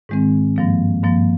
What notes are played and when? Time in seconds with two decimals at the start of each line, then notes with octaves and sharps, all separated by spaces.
0.09 G#2 D#3 G#3 C4
0.56 G2 F3 A#3
1.04 G2 F3 A#3